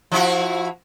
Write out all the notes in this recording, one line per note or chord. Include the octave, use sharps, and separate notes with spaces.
F3 E4 F#4